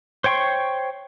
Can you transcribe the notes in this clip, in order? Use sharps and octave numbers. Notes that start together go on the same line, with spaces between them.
C5 C#5 G5 C6 C#6